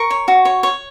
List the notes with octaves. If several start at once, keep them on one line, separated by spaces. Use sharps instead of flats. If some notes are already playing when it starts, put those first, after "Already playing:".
Already playing: A#4 C#6
C#5
F#4
C#5
C#5